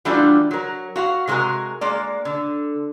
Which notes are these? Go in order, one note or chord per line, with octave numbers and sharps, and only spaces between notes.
E3 G3 A3 D4 F4 F#4
F#3 A#4
F#4 F5 F#5
C3 G#3 F#4 G#4 A#4
G#3 A#3 D5
D3